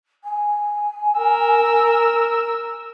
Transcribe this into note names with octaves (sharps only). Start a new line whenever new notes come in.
G#5
A#4 E6